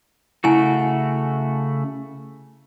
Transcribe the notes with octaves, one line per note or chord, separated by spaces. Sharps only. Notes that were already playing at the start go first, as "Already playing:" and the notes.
C#3 A3 E4 F#4 G#5